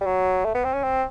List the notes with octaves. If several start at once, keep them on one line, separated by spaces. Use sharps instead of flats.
G3
F#3
A3
B3
C4
C#4
C4